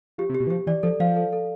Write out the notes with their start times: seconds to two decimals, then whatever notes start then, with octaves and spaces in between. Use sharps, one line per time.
0.18 F3 G4
0.29 C3
0.35 G4
0.40 B2
0.47 E3
0.50 F3 G4
0.67 E3 D5
0.83 F3 A4
1.00 F3 F5
1.16 A4
1.33 A4